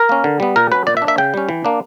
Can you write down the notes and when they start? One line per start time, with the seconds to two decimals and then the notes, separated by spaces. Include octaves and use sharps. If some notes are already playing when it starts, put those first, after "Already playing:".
Already playing: A#4
0.09 A#3 C#4
0.24 D3
0.40 G3 B3
0.56 A#2 A#4
0.72 F#3 C#4 B4
0.87 A#2 D5
0.97 E5
1.02 D4
1.07 A#3 E5
1.18 C#3 G5
1.34 G3 C#4
1.49 E3
1.65 A#3 D4